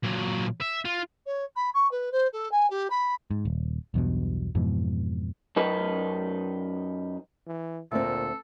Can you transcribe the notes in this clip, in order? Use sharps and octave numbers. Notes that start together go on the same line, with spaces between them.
A#2 F#3
E5
F4
C#5
B5
C#6
B4
C5
A4
G#5
G4
B5
G#2
D#1
B1 E2 G2 B2
F2 G#2 B2 E3
F#2 D#4 B4
E3
D2 A#2 C4 A4